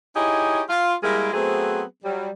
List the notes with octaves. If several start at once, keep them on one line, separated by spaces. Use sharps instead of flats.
D#4 E4 G4 G#4 C#5 D#5
F4
G3 G#3 A#3 E4 G#4 A#4
F#3 A3 B3 C4 G#4 C5
F#3 G3